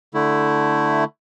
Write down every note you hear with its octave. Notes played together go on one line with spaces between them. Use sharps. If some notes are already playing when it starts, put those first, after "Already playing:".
D3 A3 E4